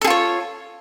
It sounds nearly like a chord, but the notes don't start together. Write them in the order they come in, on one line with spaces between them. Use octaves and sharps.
A4 G#4 F4 C#5